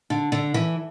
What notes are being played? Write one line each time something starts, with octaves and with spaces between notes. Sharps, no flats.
D3
D3
E3